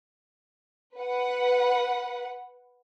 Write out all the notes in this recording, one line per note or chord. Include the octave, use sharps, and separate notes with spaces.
B4 F#5